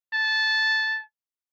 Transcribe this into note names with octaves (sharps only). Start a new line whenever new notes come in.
A5